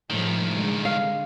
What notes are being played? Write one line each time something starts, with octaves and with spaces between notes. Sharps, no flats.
C2 A2 D#3 F3 G#3
D3 G#3
F5